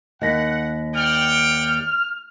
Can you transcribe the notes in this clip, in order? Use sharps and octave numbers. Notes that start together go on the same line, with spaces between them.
D#2 D#5 F#5 A#6 B6
D5 F#5 G5 F6